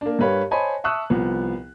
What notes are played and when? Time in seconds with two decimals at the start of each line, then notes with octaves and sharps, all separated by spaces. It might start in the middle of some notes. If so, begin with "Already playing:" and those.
0.01 A#3 D4
0.19 G2 G4 A#4 B4 C#5 F5
0.51 C5 C#5 D#5 G#5 A5 B5
0.84 E5 A5 C#6 D#6 E6 F#6
1.10 C2 F3 B3